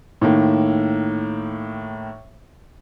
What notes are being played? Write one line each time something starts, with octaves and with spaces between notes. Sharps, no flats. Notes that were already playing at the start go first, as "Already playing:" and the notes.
A2 D#3 A#3